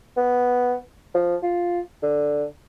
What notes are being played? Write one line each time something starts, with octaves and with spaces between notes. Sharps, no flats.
B3
F3
F4
D3